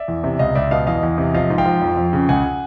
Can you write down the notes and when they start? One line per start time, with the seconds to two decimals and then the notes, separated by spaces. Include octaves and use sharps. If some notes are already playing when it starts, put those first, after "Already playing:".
Already playing: D5 E5
0.08 E2
0.24 C3
0.39 C#2 D#5 F5
0.55 C#2 D5 E5
0.71 B2 D#5 F5
0.87 E2 D#5 F5
1.03 E2
1.18 C3
1.34 F3 D#5 F5
1.50 G#2
1.58 F5 G5
1.66 F3
1.82 F2
1.97 F2
2.13 C#3
2.29 C#2 F#5 G#5